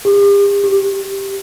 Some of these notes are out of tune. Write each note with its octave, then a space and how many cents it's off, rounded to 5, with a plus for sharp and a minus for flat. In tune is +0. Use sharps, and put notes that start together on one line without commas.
G4 +40
G4 -5